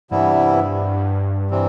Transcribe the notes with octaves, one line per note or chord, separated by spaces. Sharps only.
G2 C3 E3 G3 B3 E4
C3 E3 G3 C4